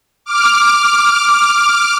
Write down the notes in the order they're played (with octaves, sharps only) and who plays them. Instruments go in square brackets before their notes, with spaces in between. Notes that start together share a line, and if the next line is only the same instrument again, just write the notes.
[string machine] D6 F6